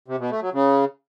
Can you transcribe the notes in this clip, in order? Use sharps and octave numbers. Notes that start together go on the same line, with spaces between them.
C3
B2
A3
F#3
C#3